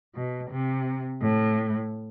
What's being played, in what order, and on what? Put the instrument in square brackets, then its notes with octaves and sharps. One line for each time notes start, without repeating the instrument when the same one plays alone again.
[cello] B2
C3
A2